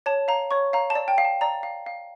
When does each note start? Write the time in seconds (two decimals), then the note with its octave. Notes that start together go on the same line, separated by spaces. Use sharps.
0.06 C#5 A5
0.28 F5 A#5
0.51 C#5 C#6
0.73 F5 A#5
0.90 A5
0.95 D5
1.08 G5
1.18 F5
1.25 A5
1.41 D5 A#5
1.63 F5
1.86 F5